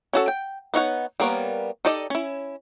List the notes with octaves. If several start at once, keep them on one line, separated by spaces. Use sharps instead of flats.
C#4 F#4 A4
G5
B3 D#4 C#5 F#5
G3 A#3 B3 A#4 C#5
D#4 G4 A4 D5 D#5
C#4 E4